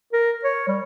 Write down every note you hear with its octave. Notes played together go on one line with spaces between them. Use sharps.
A#4
C#5
G3